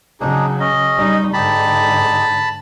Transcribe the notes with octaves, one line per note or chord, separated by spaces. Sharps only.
C#3 F#3 D4 D#4 G#4
C#4 D#5
G3 D#4
G#2 D3 D#4 G4 A5 B5